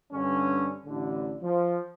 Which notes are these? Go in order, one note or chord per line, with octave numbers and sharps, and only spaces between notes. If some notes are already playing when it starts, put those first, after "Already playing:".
G2 D3 C#4
A1 D3
F3